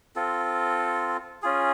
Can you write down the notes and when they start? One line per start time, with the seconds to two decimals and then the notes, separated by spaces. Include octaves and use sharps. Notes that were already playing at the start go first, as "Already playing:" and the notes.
0.16 C4 F4 A4
1.42 C#4 F4 G#4